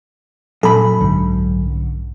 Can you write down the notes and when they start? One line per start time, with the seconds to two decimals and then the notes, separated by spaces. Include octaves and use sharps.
0.63 F#2 A#2 A4 B5
1.01 B1 G#2 D3